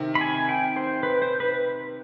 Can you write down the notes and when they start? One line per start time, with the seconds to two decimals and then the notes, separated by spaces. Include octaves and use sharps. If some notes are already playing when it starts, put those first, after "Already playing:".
Already playing: C3 D#3
0.15 B5
0.21 G#5
0.49 G5
0.76 C5
1.03 B4
1.22 C5
1.40 B4